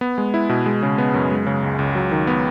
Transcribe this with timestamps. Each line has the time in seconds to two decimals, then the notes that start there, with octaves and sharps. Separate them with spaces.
0.01 B3
0.18 G#3
0.34 E4
0.49 B2
0.66 G#3
0.83 C#3
0.98 B3
1.14 F#2
1.31 G#3
1.46 C#3
1.63 C#2
1.79 C#2
1.95 F#3
2.11 D#3
2.27 B3